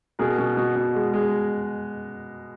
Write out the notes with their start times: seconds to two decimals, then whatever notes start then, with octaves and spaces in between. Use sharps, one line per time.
0.19 B2 G#4 A#4
0.38 B2
0.57 B2
0.76 B2
0.95 G#3
1.14 G#3